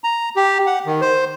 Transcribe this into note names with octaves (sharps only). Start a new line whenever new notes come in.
A#5
G4
F#5
D#3
C5